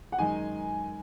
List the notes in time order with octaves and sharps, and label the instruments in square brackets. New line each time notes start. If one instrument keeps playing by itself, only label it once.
[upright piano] F#5
[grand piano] F#2 D#3 G#3 D#4 [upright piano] G#5